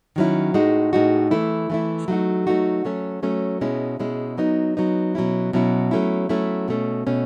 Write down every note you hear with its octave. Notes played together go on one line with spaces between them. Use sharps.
D#3 F#3 C#4 E4
A2 G#3 D#4 F#4
A2 G#3 D#4 F#4
E3 A3 E4
E3 A3 E4
F#3 A3 D#4 F#4
F#3 A3 D#4 F#4
F#3 A3 C#4
F#3 A3 C#4
B2 G#3 C#4 E4
B2 G#3 C#4 E4
F#3 B3 D#4
F#3 B3 D#4
B2 F#3 C#4 E4
B2 F#3 C#4 E4
F#3 A3 C#4 E4
F#3 A3 C#4 E4
B2 A3 C#4
B2 A3 C#4